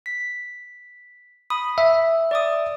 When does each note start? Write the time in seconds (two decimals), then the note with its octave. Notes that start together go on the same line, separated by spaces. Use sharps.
0.06 B6
1.50 B5 D#6
1.78 E5
2.31 D5 D6 D#6